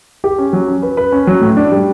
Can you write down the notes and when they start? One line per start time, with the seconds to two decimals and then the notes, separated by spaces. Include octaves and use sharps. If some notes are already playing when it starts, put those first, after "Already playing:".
0.24 G4
0.38 C#4
0.53 F#3
0.68 C#4
0.82 B4
0.97 B4
1.12 C#4
1.27 F#3
1.41 A2
1.57 D4
1.72 G3